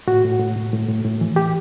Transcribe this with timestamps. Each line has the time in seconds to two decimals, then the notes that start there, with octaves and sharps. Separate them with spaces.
0.07 A2 F#4
0.24 A2
0.39 A2
0.56 A2
0.73 A2
0.88 A2
1.04 A2
1.21 E3
1.36 G4